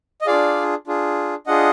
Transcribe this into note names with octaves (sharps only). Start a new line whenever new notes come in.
D#5
D4 F4 G#4 D5 F5
D4 F4 G#4
D4 F4 G#4 D#5 F#5